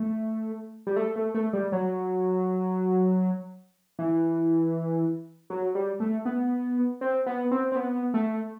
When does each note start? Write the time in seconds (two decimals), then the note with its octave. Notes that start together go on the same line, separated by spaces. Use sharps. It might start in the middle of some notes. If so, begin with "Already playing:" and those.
Already playing: A3
0.87 G3
0.96 A3
1.16 A3
1.35 A3
1.53 G3
1.72 F#3
3.99 E3
5.50 F#3
5.75 G3
6.00 A3
6.25 B3
7.01 C4
7.26 B3
7.51 C4
7.72 C4
7.76 B3
8.14 A3